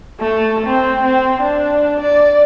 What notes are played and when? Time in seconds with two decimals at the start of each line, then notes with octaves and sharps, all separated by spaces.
0.20 A3
0.66 C4
1.03 C4
1.41 D4
2.00 D5